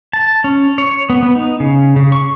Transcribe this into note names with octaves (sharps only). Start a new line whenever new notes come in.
A5
C#4
C#5
B3
B3
D#4
C#3
C#3
C#6